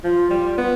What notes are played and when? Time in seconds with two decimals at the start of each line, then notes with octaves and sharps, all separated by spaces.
0.03 F3 F4
0.30 G3
0.58 B3